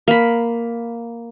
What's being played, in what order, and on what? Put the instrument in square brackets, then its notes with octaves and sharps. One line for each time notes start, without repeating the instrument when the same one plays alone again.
[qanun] A#3 B5